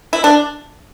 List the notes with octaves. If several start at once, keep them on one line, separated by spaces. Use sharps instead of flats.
E4
D4